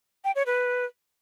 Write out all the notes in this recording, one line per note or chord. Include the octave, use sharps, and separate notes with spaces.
G5
C#5
B4